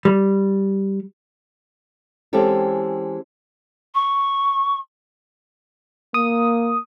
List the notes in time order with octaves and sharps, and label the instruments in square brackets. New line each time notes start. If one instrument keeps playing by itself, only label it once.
[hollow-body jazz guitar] G3
[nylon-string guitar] E3 G#3 C4 C#4 G4 A4
[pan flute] C#6
[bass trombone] A#3 [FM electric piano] D#6